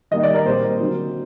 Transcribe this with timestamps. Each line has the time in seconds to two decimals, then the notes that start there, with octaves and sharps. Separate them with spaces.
0.11 D#3 G3 A#3 D#5
0.23 D5
0.34 A#4
0.45 A#2 G3 C4 C5
0.79 D3 F#3 C4